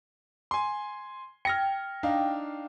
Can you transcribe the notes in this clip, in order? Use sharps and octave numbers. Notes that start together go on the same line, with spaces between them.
G#5 C6
G5 F6 A#6 C#7
D4 D#4 F5